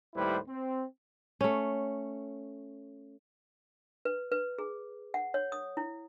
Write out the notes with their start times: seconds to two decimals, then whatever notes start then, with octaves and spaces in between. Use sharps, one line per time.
0.15 D#2 A2 G3 E4 B4 C5
0.48 C4
1.41 A3 C#4
4.05 B4
4.32 B4
4.59 G#4
5.14 F#5
5.34 C#5
5.52 D#6
5.77 E4